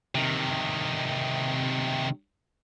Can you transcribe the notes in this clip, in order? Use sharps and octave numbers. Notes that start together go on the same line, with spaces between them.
C3 D#3